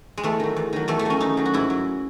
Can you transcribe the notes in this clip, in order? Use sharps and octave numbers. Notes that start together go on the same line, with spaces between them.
G#3
E2 A3
D#3 F#3
E2
D#3 F#3
E2 A3
A3
D#3 F#3 C#4
E2 D#4
D#3 F#3
F#4
G#2 E4
F#3